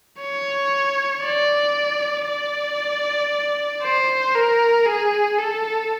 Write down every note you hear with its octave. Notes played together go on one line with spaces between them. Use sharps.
C#5
D5
D5
C5
A#4
G#4
A4